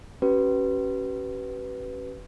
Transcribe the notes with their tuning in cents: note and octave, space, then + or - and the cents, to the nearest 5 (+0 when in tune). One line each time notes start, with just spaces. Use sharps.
C#4 +0 G4 -45 B4 +0